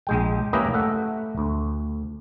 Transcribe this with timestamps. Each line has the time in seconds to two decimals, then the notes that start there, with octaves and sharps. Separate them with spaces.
0.07 A#1 G#3 G5
0.53 A#3 C#4 E4 G4 B4 D#5
0.74 A3 E5 F#5
1.38 D2